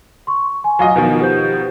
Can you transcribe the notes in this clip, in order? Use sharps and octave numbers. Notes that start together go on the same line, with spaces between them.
C6 C#6
G#5
F#3 F4 D#5
B2 D#3 F3
G4 C5 G6